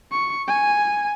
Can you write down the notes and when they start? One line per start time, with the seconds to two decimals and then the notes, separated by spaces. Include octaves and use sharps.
0.12 C#6
0.48 G#5